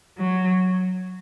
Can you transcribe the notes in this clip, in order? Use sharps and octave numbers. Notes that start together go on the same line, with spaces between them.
F#3